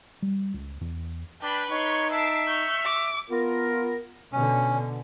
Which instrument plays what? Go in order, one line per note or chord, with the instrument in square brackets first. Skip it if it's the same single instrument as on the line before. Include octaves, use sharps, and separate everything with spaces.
[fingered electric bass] G3
C#2
E2
[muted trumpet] D4 [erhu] B4 [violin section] G5 B5
[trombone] D#4 [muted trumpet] C#5 [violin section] C6 C#6
[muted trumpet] E5 [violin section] A5 C7 D7
[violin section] C#6 F6 [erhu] G6
[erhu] D6
[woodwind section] B3 F4 A#4
[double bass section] B2 D3 [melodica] C#4